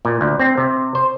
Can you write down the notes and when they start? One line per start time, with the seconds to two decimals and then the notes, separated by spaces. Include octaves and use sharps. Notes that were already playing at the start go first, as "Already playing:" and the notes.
0.05 A#2
0.21 D2
0.39 C4
0.58 C3
0.95 C5